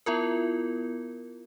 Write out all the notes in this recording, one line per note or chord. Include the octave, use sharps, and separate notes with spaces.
B3 E4 F4 A#4